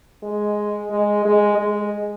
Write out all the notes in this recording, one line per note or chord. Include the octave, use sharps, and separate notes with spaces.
G#3
G#3
G#3
G#3